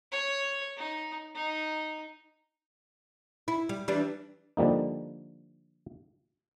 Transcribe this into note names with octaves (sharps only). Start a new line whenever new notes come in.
C#5
D#4
D#4
E4
G3
E3 G3 D4
D3 F3 G3 A#3 D#4